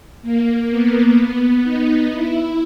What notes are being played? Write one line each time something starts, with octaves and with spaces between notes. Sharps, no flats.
A#3
B3
D#4
E4